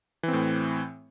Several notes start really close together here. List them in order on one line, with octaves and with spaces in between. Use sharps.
E3 C4 A2